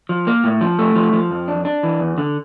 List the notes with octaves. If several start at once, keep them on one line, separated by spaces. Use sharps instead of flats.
F3
A#3
A2
F3
A3
F3
F3
F2
D4
D4
E3
E2
D3